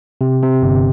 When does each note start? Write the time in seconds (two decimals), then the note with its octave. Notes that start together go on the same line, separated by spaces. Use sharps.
0.21 C3
0.43 C3
0.62 G1